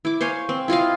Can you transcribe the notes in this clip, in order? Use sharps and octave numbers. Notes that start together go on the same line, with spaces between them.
E4 D6
C5 C#5 F5 G#5
C4
E4 F4 D#5 F5